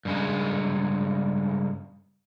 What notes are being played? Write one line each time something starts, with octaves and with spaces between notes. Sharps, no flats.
G2 C#3 G#3